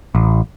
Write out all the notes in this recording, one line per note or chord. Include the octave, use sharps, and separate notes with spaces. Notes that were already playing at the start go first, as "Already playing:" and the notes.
A1